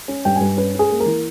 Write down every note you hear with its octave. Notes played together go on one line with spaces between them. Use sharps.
C#4
G2 G5
G2 G#5
C#4 B4
C#4
G#4
A#3
A#4
E3